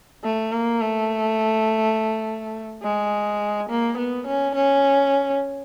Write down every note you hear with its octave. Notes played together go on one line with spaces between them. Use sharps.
A3
A#3
A3
G#3
A#3
B3
C#4
C#4